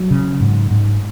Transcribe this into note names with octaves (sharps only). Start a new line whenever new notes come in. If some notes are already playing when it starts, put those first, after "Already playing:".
Already playing: F#3
C#3
G#2
G#2